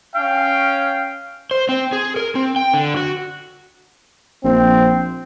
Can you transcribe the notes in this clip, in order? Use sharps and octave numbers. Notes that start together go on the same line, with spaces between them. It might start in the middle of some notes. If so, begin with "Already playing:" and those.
C#4 F5 G5
C5
C4
G#4
A#4
C4
G5
D3
F#4
A#1 C4